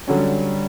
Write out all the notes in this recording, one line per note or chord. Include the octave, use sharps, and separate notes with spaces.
D3 F#3 G3 C#4